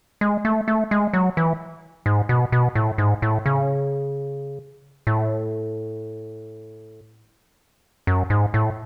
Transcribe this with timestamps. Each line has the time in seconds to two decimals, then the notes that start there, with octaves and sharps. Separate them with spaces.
0.21 G#3
0.45 A3
0.68 A3
0.91 G#3
1.13 F#3
1.37 E3
2.06 G#2
2.29 B2
2.52 B2
2.75 A2
2.98 G#2
3.22 A2
3.46 C#3
5.07 A2
8.07 F#2
8.30 G#2
8.54 A2